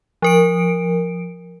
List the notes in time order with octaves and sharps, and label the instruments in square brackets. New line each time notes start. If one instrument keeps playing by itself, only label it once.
[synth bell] F3 A#4 D7